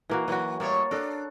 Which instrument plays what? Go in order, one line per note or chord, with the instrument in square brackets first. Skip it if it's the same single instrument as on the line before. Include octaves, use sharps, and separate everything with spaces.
[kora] E3 A#3 F#4
[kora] E3 F#4 [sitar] F#3
[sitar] A2 G3 C#5 [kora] A#3
[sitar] D4 [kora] A4 A#4